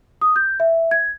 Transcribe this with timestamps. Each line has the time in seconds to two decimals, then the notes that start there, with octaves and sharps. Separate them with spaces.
0.21 D#6
0.36 G6
0.60 E5
0.91 G#6